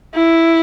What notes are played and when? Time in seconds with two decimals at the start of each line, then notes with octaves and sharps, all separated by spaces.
0.15 E4